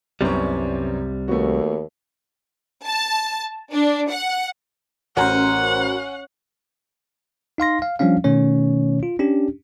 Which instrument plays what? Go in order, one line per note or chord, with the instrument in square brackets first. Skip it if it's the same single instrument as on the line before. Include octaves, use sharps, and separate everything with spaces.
[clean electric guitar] C2 C3 G3 [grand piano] F#2 B3 C#4
[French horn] D#2 [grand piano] A3 B3 F#4
[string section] A5
D4
F#5
[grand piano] A1 [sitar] C#4 [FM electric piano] F#4 A#4 C5 [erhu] F#5
[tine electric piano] D#4 F5 C6 A#6
F5
F3 G3 C#4 D4 F5
B2 D#3 A3 C#4 C#5
F4
C#4 D4 G4